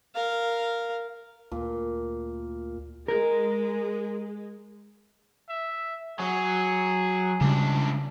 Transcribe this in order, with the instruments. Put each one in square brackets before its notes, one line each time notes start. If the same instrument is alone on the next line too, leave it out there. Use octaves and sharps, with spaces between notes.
[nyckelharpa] A#4 F5
[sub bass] D2 [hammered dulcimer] A#2
[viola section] G#3 [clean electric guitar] A#4
[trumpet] E5
[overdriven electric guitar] F#3 [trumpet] G#4
[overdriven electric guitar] C#2 D4 [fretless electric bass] C#3 G3